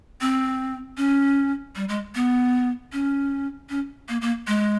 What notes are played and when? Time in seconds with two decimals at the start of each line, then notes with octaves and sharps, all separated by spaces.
0.21 C4
0.97 C#4
1.76 G3
1.89 G#3
2.15 B3
2.93 C#4
3.70 C#4
4.09 A#3
4.22 A#3
4.47 G#3